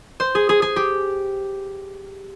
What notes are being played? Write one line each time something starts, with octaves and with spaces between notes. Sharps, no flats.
C5
G#4
G#4
G#4
G4